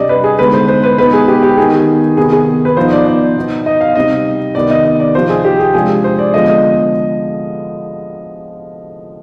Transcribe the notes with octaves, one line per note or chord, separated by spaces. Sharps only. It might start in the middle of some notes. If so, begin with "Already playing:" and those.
Already playing: C3 G3 D4 D5 D#5
B4
G#4
D3 G#3 B3 D#4 B4
C5
C5
B4
B2 G#3 B3 D#4 B4
G#4
G4
G4
D#3 B3 D#4 G#4
C3 D#3 B3 D#4 G#4
G#4
B4
F3 B3 D#4 C5
D5
D5
B2 B3 D#4
D#5
F5
C3 G3 C4 D#4 D#5
C3 D#3 B3 D#4 D5
D#5
D#5
D5
C3 F3 C4 D#4 C5
G#4
G4
G#4
C3 F3 G#3 D4 G#4
C5
D5
D3 F3 G#3 B3 D#5
D#5